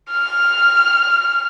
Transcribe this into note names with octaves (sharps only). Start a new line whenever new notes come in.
F6